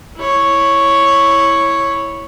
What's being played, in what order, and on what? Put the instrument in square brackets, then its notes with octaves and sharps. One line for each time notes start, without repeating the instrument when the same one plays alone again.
[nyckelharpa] E4 C#5